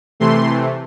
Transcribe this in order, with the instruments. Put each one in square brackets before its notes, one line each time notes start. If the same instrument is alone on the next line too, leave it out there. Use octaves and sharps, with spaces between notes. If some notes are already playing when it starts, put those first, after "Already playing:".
[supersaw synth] C3 E3 A3 C6